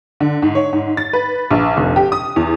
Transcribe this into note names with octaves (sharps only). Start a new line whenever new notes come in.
D3
G#2
C#5
G#2
A6
B4
A#1
F1
G4
D#6
E2